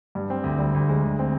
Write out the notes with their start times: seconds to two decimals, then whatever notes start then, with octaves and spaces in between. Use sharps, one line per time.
0.15 G2
0.30 C4
0.44 D2
0.59 G3
0.74 D2
0.89 G#3
1.04 D2
1.19 C4